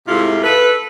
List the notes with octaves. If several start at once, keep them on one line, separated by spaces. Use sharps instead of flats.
G#2 C3 A3 E4 F4
A4 B4